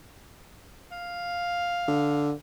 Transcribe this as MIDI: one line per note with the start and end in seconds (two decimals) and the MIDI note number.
0.91 2.35 77
1.87 2.32 50